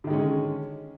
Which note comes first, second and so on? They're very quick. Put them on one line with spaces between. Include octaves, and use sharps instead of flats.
D3 D#3 G#3 C#4